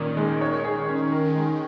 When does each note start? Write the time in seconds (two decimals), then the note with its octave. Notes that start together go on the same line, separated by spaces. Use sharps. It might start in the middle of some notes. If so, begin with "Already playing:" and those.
Already playing: A#2 D#3 C#4
0.17 G#3
0.41 C#5
0.65 G#4
0.88 C#4
1.12 A#4
1.35 G#3